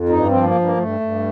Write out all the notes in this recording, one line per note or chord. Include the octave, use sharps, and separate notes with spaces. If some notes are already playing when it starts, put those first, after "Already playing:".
Already playing: F2
G2 D#4
F3 C4
A#3
G2
A#3
G2 A3
G2